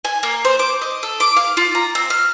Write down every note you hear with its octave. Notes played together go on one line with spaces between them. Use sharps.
G#5
A#3
C5
D6
D#5
A4
D6
F5
F4
A#5
C4
F6